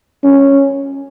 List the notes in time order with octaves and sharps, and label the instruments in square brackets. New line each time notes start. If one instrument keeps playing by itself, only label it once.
[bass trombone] C#4